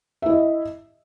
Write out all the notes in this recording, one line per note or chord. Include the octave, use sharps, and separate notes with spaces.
E4 D#5 E5